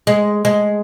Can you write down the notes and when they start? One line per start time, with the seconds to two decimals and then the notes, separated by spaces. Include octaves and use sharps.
0.07 G#3
0.45 G#3